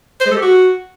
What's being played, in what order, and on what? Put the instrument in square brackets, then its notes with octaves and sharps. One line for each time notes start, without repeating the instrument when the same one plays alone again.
[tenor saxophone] C5
G#3
A4
G4
F#4